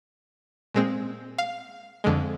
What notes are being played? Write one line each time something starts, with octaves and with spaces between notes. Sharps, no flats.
A#2 G#3 C4
F5
F2 D3 G#3